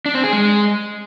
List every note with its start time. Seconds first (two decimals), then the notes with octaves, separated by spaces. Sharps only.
0.06 D4
0.15 C4
0.24 G#4
0.33 G#3